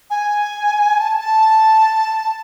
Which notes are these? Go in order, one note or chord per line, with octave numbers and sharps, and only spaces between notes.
G#5
A5
A5